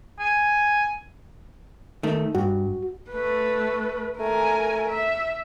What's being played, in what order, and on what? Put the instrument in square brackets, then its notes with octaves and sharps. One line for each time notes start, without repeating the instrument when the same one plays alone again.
[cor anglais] G#5
[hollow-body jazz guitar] D#3 A3
[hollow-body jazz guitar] G2 [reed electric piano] F#4
[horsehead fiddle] A3 B4
[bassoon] A3 [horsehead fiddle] A#4 G#5
[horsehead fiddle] E5